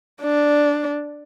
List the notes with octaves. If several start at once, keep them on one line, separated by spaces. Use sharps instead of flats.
D4